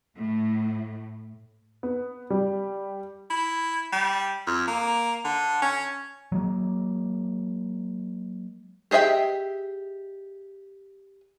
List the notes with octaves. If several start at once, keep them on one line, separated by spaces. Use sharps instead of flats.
A2
B3
G3
E4
G3
F2
A#3
D3
C#4
F#3 G#3 A#3
G4 G#4 D#5 E5 G5